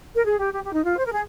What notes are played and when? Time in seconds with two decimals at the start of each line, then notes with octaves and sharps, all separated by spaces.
0.15 A#4
0.25 G#4
0.39 G4
0.53 G4
0.64 G4
0.73 D#4
0.83 F4
0.97 C5
1.05 A#4
1.13 G#4